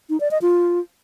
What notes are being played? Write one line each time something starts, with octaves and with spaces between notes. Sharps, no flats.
D#4
D5
D#5
F4